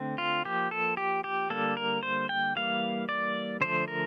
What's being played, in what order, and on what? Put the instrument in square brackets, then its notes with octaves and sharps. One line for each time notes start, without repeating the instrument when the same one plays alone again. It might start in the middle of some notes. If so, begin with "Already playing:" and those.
Already playing: [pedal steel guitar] D3 A3 C4
F4
F3 A#3 G4
A4
G4
G4
D3 G3 A#3 A4
A#4
C5
G5
E3 G3 A#3 F5
D5
D3 F3 A3 C5
A#4